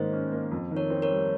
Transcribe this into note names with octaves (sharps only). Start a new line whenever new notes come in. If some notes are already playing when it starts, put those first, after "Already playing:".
Already playing: G#2 D#3 A#3 C#4 C5 D#5
C#4
A#3
F2
D#3
A#4 C#5
C4
A#4 C#5
G3